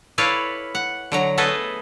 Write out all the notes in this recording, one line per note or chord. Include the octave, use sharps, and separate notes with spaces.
E4 A4 B4 C#5 D5 F5
F#5
D3 F#3 A#5
A3 B3 G#4 A4 B4 D#5